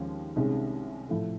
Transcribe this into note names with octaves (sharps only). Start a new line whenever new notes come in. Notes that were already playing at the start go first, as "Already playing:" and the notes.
Already playing: D#2 C#3 F3 G#3 C#4
C2 C3 D#3 G#3 C#4
A2 F3 A3